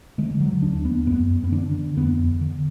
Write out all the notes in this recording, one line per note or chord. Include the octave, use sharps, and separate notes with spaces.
D3 G#3
D3 F#3
D#2 D4
D#2 B3
F#2 B3
F#2
B3
D3 D4
D3
F2 B3
F2
D3